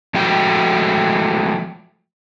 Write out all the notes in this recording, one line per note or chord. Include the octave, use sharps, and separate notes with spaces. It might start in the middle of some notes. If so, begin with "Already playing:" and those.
F3 G#3 A3 F#4 G5